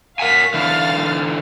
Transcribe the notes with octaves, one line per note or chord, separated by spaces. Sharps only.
A#4 F5 F#5 G#5 B6
D3 E3 F5 F6 A6